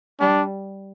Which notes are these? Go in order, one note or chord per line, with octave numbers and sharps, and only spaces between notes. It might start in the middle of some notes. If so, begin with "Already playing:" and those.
G3 D4